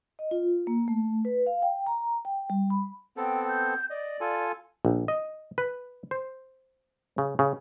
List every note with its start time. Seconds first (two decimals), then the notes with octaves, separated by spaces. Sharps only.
0.19 D#5
0.31 F4
0.67 A#3
0.88 A3
1.25 B4
1.47 F5
1.62 G5
1.87 A#5
2.25 G5
2.50 G3
2.70 B5
3.17 B3 C4 A4 G5
3.48 G6
3.90 D5 D#5
4.21 F4 A4 G#5
4.85 A#1
5.08 D#5
5.58 B4
6.11 C5
7.18 C#3
7.39 C#3